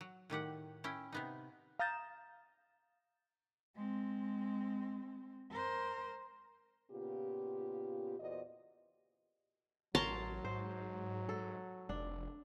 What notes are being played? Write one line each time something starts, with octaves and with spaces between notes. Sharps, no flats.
F#3
A2 D#3 G4 F#5
C#4 E4 G5
C3 B3 D#4
F5 A#5 D#6 G6 A6 E7
G#3 C4
A#4 C5
A#2 C#3 B3 F4 G4
E2 A#2 F#4 C5 D5 D#5
A1 F#3 A#4 C#5 A5 A#5 C6
G#2 C5
A4
F1 D4